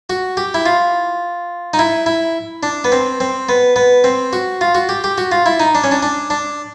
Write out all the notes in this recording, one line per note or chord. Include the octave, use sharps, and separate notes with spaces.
F#4
G4
E4
F4
D#4
E4
E4
D4
B3
C4
C4
B3
B3
C4
F#4
F4
F#4
G4
G4
F#4
F4
E4
D#4
D4
C#4
D4
D4
D4